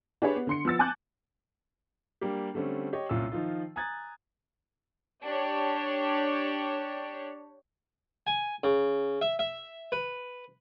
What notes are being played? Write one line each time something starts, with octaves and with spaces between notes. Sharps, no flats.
D4 G4 G#4 B4 C#5
B3
D3 C6 C#7
F3 B3 E6 A6
G#5 A5 D6 F#6 G6
G3 A#3 D4 G4
D3 G3 A3 C4 C#4
G4 C#5 D#5
C2 A#2 C#4 F4 E6
D#3 F3 D#4 F4
G#5 A#5 D#6 F#6 G#6 A6
D4 G4 C#5
G#5
C#3
E5
E5
B4